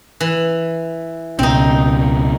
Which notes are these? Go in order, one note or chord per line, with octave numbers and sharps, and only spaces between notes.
E3
C#2 B2 C4 C#4 D#4